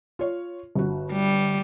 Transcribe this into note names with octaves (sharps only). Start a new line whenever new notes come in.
F4 C#5
G1 F#4
G3